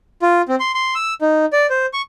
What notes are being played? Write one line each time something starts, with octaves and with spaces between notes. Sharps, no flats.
F4
C4
C6
C6
E6
D#4
D5
C5
C#6